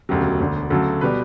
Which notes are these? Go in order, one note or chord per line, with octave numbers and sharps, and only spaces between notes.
E1 D2 C#3 F#3 G4
E1 D2 D3
D2 C#3 F#3 A4
B2 G3 B4